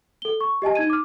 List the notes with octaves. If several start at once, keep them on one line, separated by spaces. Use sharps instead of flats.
A4 G7
C#6
G4 D#5 G#5 A5
D#4 G#6 D#7
D6 F6